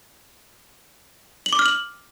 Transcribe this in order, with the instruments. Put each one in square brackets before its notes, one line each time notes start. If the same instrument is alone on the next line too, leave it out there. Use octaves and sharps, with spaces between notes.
[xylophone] F#7
D6
F6
F#7